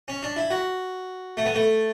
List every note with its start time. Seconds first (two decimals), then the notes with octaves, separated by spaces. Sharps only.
0.08 C#4
0.23 D4
0.36 E4
0.50 F#4
1.37 A3
1.46 B3
1.54 A3